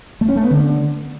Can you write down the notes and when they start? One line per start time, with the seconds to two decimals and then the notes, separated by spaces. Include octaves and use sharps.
0.21 A3
0.29 C#4
0.36 A3
0.43 B3
0.51 D3